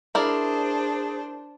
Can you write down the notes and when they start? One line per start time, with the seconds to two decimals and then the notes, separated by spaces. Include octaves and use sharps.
0.15 D4 E4 G#4 A#4 C5 D5